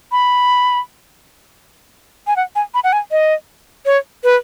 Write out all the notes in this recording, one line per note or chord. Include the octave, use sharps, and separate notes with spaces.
B5
G#5
F#5
G#5
B5
F#5
G#5
D#5
C#5
B4